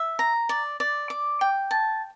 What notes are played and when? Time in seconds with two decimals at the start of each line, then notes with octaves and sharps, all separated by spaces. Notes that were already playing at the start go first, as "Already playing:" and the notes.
Already playing: E5
0.19 A#5
0.49 D5
0.80 D5
1.10 D6
1.41 G5
1.71 A5